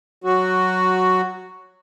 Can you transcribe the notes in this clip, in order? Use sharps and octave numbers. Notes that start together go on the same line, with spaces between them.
F#3 F#4